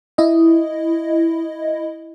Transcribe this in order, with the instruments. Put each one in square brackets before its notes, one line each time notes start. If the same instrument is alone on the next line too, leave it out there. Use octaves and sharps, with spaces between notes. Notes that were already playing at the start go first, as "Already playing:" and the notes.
[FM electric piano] E4 D#5